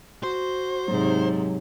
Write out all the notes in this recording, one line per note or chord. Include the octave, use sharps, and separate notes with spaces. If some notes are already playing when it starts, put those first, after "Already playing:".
F#4 C5
G#2 C3 F#3